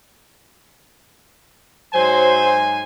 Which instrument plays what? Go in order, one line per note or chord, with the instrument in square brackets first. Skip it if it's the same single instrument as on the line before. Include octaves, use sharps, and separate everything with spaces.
[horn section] G#2 G#5 [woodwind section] F#3 C5